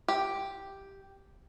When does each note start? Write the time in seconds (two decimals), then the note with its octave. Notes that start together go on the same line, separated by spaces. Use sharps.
0.08 G4